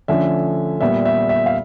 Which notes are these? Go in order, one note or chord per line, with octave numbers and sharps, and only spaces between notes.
D3 F3 A3 C#4 E5
A#2 G3 B3 E5
E5
E5
F5